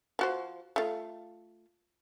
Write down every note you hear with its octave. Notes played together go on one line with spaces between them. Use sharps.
F3 F#4 C5
A3 F4